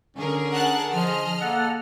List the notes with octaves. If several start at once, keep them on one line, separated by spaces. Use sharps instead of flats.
D3 C#4 G#4 A#4
F#5 A5 F#6
F3 G#4 D#5 F6
A#3 A4 F#5